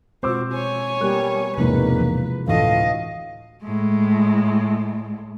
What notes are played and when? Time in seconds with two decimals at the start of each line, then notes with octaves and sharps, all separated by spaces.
0.23 B2 G#3 C4 F4 F#4 C5 D6 E6
0.53 C#5 G#5
1.01 G3 A#3 B3 F#6
1.58 E1 E2 G#2 C3 F3 G#3 A#3 B4
1.99 E3 F3
2.48 D2 A2 E3 F3 F#4 D#5 F5
3.63 A2 G#3